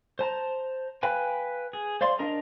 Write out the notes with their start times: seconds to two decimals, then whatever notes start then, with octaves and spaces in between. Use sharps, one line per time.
0.19 C5 A5 A#5
1.03 B4 F5 G5 G#5
1.73 G#4
2.01 C5 D5 F5 C6
2.19 D4 A#4 D#5 A#5